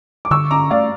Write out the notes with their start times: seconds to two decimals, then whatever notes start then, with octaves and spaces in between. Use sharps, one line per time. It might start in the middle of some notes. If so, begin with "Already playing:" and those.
0.25 D6
0.31 D3 C#6 E6
0.51 C#4 A#5 D6
0.70 A3 D5 F5